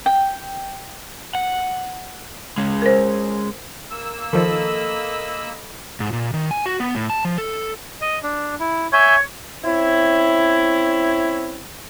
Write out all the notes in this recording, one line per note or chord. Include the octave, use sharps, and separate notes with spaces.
G5
F#5
G#3 C#4
A#4 C5
A#3 E6
D#3 F3 A4 D#5 B5
G#2
A#2
D#3
G#5
F#4
B3
A2
A5
F3
A4
D#5
D4
E4
C#5 E5 G#5 G6
C4 C#4 E4